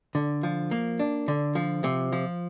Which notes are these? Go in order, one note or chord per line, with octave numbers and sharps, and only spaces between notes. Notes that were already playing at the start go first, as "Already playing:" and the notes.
D3
F3
A#3
D4
D3
F3
C3
F3